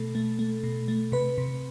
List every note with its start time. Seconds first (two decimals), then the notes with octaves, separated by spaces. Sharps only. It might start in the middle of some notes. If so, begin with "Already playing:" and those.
Already playing: B2 A3 A4
0.15 A3
0.39 A3
0.63 B2
0.88 A3
1.12 C3 B4
1.38 C3